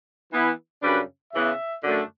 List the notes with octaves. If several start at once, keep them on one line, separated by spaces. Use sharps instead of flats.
E3 B3 E4
F#2 C#3 G3 D4 B4
C#3 E3 B3 E5
F#2 D3 A3 D4